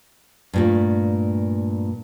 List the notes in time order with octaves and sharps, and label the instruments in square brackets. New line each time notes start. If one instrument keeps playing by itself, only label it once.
[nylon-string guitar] G2 A#2 A3